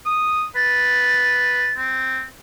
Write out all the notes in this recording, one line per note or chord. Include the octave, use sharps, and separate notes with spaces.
D#6
B4 A6
C4